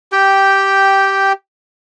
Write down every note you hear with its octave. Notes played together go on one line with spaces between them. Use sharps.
G4 G5